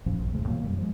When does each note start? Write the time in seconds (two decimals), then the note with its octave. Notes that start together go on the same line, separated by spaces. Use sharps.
0.06 G2 A#2 F3 C#4
0.19 A#1 E2
0.33 E2 G#2 C#3 A3
0.47 B2 E3 F#3 A#3
0.64 F#2 D#3 G3
0.78 F3 G#3